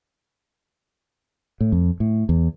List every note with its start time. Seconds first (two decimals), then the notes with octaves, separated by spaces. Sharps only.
1.61 A2
1.72 F2
2.00 A2
2.29 E2